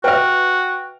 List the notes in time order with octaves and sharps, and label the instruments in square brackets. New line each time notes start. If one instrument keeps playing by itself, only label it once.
[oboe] F#4 [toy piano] B4 E5 [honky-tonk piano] G5 F6